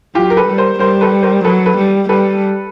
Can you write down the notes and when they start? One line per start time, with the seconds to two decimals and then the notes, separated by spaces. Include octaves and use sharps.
0.15 F#3 F4 G4
0.30 A#4
0.37 A4 B4
0.48 G3
0.58 A#4 C5
0.79 G3 A#4 C5
1.01 A4 B4
1.23 A#4 C5
1.44 F#3 A4 B4
1.66 A4 B4
1.77 G3
2.09 G3 A4 B4